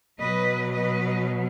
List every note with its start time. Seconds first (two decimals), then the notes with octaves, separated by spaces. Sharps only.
0.19 B2 F#3 B4 D#5
0.71 B4 D#5